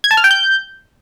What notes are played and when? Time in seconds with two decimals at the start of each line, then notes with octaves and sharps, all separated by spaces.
0.04 G#6
0.11 A5
0.17 F6
0.24 G5
0.31 G6